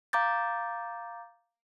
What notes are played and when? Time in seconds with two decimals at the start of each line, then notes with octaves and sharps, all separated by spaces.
0.13 F5 A#5 D6 G6 A6